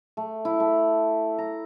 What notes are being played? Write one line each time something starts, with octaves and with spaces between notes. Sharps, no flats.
A3
E4
A3
A#5